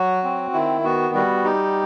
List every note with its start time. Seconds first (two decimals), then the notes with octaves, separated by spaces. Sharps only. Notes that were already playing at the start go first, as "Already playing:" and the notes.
Already playing: F#3 F#4
0.24 C4
0.54 D#3 E4
0.84 B3 F#4
1.15 G3 F#4
1.45 D#4 G4